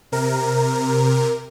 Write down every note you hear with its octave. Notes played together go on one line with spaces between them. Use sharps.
C3 A#4